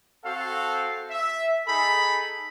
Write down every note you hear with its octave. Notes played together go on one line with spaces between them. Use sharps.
C4 F#4 A4 F5
E5
D#4 G#4 A4 B5